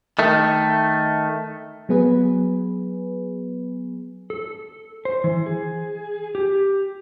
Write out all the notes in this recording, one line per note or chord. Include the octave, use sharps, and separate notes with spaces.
D#3 A3
F#3 B3 G#4 B4
A4
C5
E3
G#4
G4